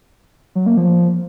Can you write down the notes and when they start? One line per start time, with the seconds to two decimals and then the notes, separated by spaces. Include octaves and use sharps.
0.55 F#3
0.66 A#3
0.77 F3